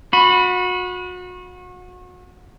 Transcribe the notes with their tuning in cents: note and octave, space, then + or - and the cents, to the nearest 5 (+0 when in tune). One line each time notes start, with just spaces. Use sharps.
F#4 -35 B5 +0